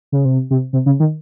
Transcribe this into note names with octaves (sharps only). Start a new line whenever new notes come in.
C#3
C3
C3
C3
C#3
D#3